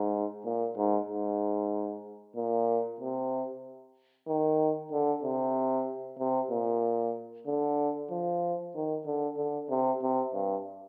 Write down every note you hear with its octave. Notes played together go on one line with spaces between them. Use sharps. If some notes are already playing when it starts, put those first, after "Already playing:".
Already playing: G#2
A#2
G#2
G#2
A#2
C3
D#3
D3
C3
C3
A#2
D3
F3
D#3
D3
D3
C3
C3
G2